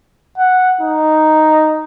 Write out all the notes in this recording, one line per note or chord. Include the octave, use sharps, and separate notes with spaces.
F#5
D#4